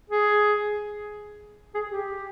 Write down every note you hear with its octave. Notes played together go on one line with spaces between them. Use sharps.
G#4
G#4
G4